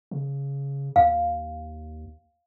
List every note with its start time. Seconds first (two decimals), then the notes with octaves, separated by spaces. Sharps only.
0.11 C#3
0.96 D#2 F5